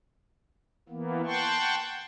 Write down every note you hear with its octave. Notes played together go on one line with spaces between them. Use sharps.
E3 A#3 B3
F#5 G5 A5 C6 C#6